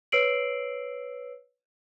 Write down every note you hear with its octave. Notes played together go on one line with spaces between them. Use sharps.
B4 C#5 E6 C7 D7 F#7